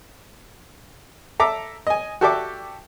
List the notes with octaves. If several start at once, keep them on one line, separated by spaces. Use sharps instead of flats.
A4 E5 A#5 D6 E6
D#5 G#5
F#4 G4 A4 D5 E5 D6